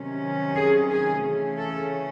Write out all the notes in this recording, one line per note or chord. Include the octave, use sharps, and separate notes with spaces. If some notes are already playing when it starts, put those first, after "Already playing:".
Already playing: C3 D#3 F#3 C#4
G#4
G#4
C#3 E3 A3 C#4
A4